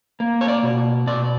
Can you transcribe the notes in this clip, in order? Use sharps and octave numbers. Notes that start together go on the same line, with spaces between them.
A#3
C#5
D5
B2
B2 D5